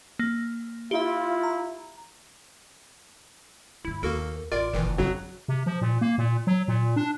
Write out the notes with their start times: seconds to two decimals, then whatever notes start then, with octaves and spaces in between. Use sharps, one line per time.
0.19 A#3
0.91 E4 F4 G4 E5
1.43 A#5
3.85 G2 D3 E4
4.03 D#2 A#3 F#4 A4 A#4
4.52 A1 F4 A#4 D5
4.73 F#1 A#2 D#3 E3
4.98 F2 C#3 F#3
5.48 C3
5.66 F3
5.82 A#2
6.01 A#3
6.18 A#2
6.47 F#3
6.68 A#2
6.96 D4